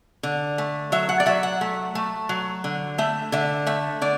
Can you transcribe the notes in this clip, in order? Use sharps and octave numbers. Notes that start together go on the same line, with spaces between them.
D3
A3
F#3 E5
F#5
D5
F#3 E5
F#5
A3
A3
F#3
D3
A3 E5
D3 E5
A3 E5
D3 D5